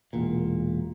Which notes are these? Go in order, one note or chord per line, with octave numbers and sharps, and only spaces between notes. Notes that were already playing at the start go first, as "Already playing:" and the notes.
E1 A#2